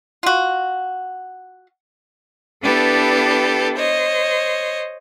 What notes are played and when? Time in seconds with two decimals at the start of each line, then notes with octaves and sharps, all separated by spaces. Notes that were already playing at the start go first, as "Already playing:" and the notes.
0.23 F4 F#4
2.62 B3 D4 E4 G4 A4 B4
3.76 C5 C#5 D#5